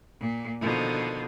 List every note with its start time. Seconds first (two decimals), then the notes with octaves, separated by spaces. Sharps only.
0.20 A#2
0.60 B2 D3 D#3 F3